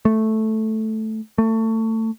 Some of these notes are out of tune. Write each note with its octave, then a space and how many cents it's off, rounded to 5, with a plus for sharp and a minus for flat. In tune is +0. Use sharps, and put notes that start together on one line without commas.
A3 -5
A3 +25